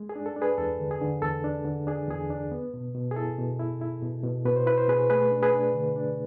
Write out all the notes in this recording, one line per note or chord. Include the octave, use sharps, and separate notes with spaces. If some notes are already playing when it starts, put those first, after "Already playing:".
Already playing: G#3
G#4
D4
A4
D4
G#4 B4
E2 A4
D3
G#4
D3
E2 A4
D4
D3
D4 G#4
E2 G#4
D4
B3
B2
B2
G#4
E4 A4
B2
E4
E4
B2
B2
B2 B4
C5
E4 B4
C5
B2 G#4 B4
A3 G#4 B4
D4
G#4 B4
D4
D3
D4